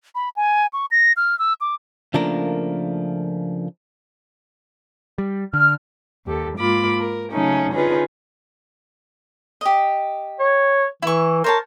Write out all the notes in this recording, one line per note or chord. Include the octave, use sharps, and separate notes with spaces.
B5
G#5
C#6
A#6
F6
E6
D6
C#3 F3 A3 A#3 D4 A#4
G3
D3 F6
D#2 G4 A4
G#2 A#3 F4 B5 D6
A#4
C#3 F#3 A3 C#4 D#4
D3 C#4 D#4 F4 G#4 B4
G4 D#5
C#5
E3 E4 C#6
A#4 C5 C#5 A5